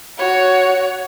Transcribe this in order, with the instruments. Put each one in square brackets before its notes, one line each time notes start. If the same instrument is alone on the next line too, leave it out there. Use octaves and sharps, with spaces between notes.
[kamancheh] F#4 C#5